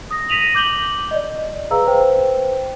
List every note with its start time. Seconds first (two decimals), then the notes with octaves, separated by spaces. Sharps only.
0.11 D#6 A#6
0.29 A#6 B6 D#7 F7 F#7
0.55 D6 G6 F#7 G7
1.11 D5 D#5
1.71 G#4 B4 F5 A#5 E6
1.86 B4 C5 G5